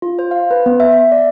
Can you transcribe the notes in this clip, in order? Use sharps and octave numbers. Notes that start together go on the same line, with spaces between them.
F4
C5
F5
B4
B3
E5
E5
D5